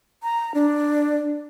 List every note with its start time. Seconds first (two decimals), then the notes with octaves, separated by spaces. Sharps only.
0.23 A#5
0.54 D4